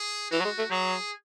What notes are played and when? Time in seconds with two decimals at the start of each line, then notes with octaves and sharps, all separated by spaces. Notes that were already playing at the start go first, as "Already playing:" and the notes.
Already playing: G#4
0.31 E3 F#4
0.40 F#3
0.45 G#3
0.59 A3
0.71 F#3 G#4